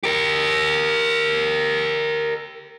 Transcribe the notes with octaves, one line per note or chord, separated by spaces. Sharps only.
G4 A#4